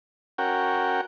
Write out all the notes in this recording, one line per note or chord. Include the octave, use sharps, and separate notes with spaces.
C#4 F#4 A#4 G5